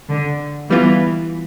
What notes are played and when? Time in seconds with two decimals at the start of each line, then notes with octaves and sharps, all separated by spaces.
0.11 D3
0.70 E3 G3 B3 F4